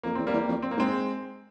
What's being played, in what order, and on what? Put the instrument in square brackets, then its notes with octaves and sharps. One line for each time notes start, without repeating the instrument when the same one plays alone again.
[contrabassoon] F2 [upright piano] A#3
[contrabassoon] E2 [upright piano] C4
[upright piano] G3 A#3
[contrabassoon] E2
F2
[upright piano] C4
A#3
[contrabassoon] G#2
[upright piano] G#3 C4